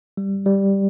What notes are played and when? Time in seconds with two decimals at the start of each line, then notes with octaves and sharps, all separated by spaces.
0.17 G3
0.46 G3